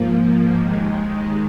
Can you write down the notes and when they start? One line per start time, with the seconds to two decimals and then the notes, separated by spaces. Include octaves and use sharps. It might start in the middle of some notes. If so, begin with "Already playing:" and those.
Already playing: G#2 F3 A#3
0.59 D#2 D#3 G#3